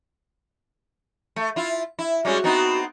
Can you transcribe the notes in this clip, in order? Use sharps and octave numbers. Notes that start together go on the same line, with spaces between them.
A3
E4 F4
E4
G3 G#3 C#4 F#4
B3 C4 D#4